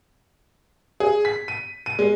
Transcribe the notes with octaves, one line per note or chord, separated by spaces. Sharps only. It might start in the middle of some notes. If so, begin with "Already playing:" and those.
G#4
B6
D#7
D#7
G#3